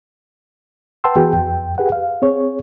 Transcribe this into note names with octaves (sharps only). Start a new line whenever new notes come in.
B4 F#5 G5 A5 C6 E6
E3 B3 F#4 G#4 B4 G5
F2 G5
G4 G#4 B4 F#5
F5
C4 G#4 C#5